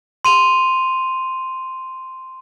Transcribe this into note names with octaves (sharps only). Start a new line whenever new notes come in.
C6 D#7 F7